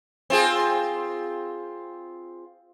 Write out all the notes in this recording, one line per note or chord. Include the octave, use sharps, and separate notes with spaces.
C4 F4 G#4